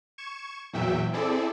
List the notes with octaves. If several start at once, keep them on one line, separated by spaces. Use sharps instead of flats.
C#6 G#6 E7
E2 A#2 F#3 E5 G5
C4 E4 G#4 A4 D5